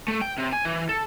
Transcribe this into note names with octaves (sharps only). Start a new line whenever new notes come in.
A3
G5
C3
G#5
E3
A4